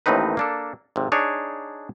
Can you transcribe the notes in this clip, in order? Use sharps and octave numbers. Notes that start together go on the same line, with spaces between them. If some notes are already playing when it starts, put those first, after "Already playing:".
A1 D#2 A2 C4 D#4 B4
A#3 D4 A4
G#1 C3
D4 D#4 G#4 C#5